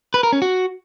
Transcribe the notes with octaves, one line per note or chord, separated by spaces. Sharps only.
B4
A#4
C#4
F#4